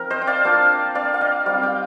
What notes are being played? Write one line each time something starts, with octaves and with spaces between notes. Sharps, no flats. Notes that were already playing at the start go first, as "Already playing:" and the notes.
Already playing: F3 C4 D#4 A#4
C5 D#5
G5
D5 F5
A#3 D4 F4
D5 F5
F5
D#5 G5
G3 C4 D#4 D5 F5
D#5 G5